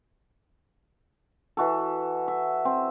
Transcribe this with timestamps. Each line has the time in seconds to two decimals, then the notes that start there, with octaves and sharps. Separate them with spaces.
1.57 E3 F#4 A4
2.28 E5
2.65 C4